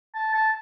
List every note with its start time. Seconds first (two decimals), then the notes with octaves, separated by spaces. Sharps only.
0.15 A5
0.34 A5